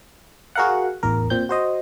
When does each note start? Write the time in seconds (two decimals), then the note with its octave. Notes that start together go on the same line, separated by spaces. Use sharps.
0.55 F#4 G#4 A#4 F5 F#5
1.03 A1 E2 A#4
1.30 A#2 C4 G6
1.49 F#4 C5 D#5